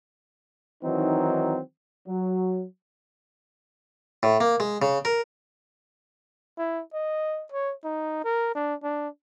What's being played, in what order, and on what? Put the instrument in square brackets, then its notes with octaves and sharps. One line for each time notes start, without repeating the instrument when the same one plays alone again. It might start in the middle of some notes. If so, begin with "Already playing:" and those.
[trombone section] D#3 E3 F#3 C4 D#4
F#3
[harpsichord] A2
A#3
G#3
C#3
A#4
[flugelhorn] E4
D#5
C#5
D#4
A#4
D4
D4